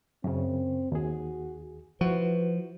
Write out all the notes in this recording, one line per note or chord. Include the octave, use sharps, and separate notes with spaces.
F#2 C#3 C4
D#2 F#4 G#4
F3 E4 F#4 B4